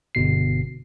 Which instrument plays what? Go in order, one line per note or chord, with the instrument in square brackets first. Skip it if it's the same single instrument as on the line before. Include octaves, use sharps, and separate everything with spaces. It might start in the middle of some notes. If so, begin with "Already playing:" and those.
[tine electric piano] G1 B2 C7